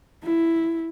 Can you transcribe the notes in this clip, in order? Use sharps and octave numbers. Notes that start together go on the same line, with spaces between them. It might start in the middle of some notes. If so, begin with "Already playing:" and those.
E4